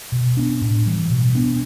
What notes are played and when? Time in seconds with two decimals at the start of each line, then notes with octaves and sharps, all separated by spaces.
0.12 B2
0.37 B3 D4
0.61 A2
0.86 E3 G3
1.10 B2
1.35 B3 D4